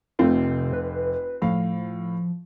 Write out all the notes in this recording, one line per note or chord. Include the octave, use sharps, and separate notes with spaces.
F1 C3 A3 C4 F4
B4
A2 F3 F5